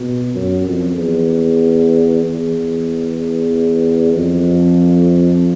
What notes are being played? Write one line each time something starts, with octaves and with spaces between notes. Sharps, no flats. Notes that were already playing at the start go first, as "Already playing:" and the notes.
Already playing: B2
F#2
F2
E2
E2
F2